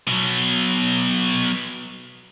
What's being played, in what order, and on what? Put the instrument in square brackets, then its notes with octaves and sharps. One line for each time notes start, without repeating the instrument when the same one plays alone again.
[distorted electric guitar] B2 F#3